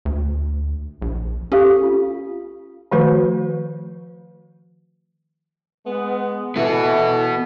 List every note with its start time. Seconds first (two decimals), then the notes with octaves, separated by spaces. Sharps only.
0.05 D2
1.02 A#1
1.52 C#4 G4 A4 F5
1.83 F4
2.91 D#3 F3 A3 F#4 B4 C5
5.86 G#3 B3
6.56 E3 B3 F#4 A4